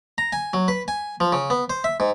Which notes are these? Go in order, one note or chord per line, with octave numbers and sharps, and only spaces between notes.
A#5
G#5
F#3
B4
G#5
F3
C#3
B3
C5
E5
G#2